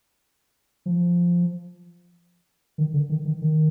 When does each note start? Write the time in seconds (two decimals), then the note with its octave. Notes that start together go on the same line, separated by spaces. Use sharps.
0.86 F3
2.78 D#3
2.94 D3
3.10 D#3
3.25 D#3
3.42 D#3